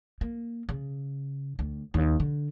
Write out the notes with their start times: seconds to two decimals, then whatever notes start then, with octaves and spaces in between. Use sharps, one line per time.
0.21 A#3
0.69 C#3
1.59 D2
1.94 D#2
2.20 D3